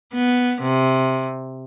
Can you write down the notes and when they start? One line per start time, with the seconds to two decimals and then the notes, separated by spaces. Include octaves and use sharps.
0.14 B3
0.62 C3